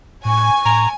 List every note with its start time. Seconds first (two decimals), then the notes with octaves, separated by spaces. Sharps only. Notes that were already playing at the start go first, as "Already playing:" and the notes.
0.25 A2 G#5 C#6
0.65 A2 A#5